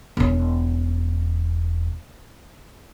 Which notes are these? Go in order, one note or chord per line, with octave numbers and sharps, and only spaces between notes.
E1 C#4